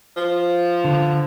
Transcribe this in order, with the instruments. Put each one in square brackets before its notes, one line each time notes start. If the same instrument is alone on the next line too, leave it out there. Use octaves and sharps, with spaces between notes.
[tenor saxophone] F3
[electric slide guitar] D3